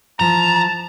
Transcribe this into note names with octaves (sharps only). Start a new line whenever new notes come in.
E3 F3 A5 A#5